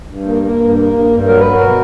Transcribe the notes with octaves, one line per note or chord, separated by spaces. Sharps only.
G2
A#3
A#3
G2
A#3
G2
G2
F#3 A#4
F#3 B4
F#4 A#4
B2